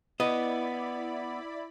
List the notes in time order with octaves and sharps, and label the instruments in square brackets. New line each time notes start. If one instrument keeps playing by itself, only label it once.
[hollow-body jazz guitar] B3 D#5 [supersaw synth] E4 D5 B5